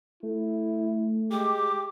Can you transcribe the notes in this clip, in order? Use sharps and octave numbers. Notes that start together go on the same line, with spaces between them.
A3 E4
G#3 G4 D6